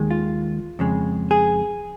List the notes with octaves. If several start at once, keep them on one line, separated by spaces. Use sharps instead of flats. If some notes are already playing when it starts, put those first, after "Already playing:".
Already playing: D#2 D#3 G#3
F4
F2 C#3 G#3
G#4